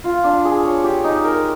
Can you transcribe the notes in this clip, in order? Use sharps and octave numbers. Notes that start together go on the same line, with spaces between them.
F4
D4
G#4
C#5
G4
D#4
A#4